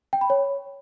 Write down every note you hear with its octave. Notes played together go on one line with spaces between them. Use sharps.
G5
B5
C#5